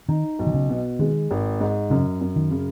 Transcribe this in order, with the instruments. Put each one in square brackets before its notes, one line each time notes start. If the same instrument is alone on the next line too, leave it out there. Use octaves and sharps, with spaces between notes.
[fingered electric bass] D#3 [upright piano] D#4
[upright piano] B1
[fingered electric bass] D#3
C#3
[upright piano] B2
[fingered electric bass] D#3 [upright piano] G#3
[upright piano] G#1
G#2
[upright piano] F#2 [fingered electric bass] C#3
[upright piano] F#2
[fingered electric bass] D#3
[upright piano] C#3